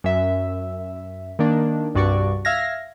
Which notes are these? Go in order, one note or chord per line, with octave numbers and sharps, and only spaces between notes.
F#2 E5
D#3 A#3 D4
C2 G2 F#4 D5 C#6
E5 F5 F6 G#6 A#6